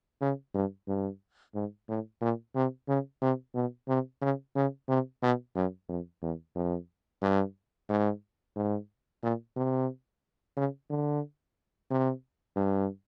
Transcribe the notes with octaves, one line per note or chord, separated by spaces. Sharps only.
C#3
G2
G2
G#2
A2
A#2
C3
C#3
C3
B2
C3
C#3
C#3
C3
B2
F#2
F2
E2
F2
G2
G#2
G#2
A#2
C3
C#3
D3
C3
G2